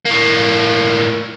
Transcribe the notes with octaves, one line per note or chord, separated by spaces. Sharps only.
A2 A#3